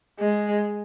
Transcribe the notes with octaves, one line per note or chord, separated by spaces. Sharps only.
G#3